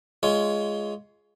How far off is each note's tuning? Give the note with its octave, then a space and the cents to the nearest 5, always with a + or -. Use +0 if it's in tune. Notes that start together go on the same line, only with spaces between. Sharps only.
G#3 +10 F4 +0 C#5 +20